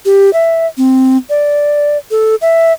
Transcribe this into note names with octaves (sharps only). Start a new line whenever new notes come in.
G4
E5
C4
D5
A4
E5